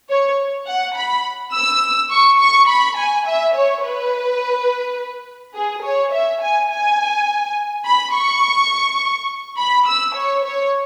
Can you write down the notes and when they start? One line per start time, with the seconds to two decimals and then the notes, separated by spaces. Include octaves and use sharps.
0.09 C#5
0.67 F#5
0.96 B5
1.54 E6
2.10 C#6
2.39 C#6
2.68 B5
2.97 G#5
3.26 E5
3.54 C#5
3.83 B4
5.55 G#4
5.84 C#5
6.12 E5
6.41 G#5
6.70 G#5
7.85 B5
8.14 C#6
9.57 B5
9.87 E6
10.15 C#5
10.44 C#5